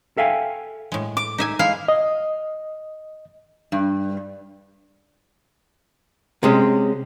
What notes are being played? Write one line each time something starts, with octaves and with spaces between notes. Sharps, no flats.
A4 E5 F5 G5 G#5
A2 G#3
D6
D#4 E5 G#5
G#3 E4 F5
D#5
G2
C3 G#3 C#4